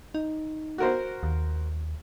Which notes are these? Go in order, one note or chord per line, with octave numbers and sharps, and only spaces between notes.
D#4
F#4 A#4 C5
D#2